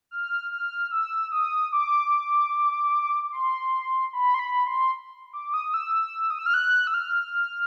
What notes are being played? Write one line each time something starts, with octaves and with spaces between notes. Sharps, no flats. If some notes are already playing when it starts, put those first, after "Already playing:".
F6
F6
E6
D#6
D6
C6
B5
C6
B5
C6
D6
D#6
E6
D#6
E6
F6
F#6
E6
F6